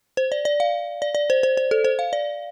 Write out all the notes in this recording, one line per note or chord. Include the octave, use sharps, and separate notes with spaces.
C5
D5
D5
F5
D5
D5
C5
C5
C5
A4
C5
F5
D5